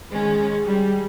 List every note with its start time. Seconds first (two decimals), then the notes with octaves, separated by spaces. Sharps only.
0.11 D#3 G#3 C#4
0.63 G3 G#3